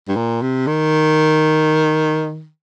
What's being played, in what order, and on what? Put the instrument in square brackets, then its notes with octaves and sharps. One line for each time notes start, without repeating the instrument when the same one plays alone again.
[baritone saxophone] G2
A#2
C3
D#3